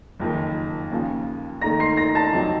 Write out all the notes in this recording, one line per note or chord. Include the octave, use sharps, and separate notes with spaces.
F#1 F2 D#3
D#2 C#3 F3
D#2 D#3 A3 D#4 A#5 A#6
C6 C7
A#5 A#6
A5 A6
F2 C3 F#3 C4 D#4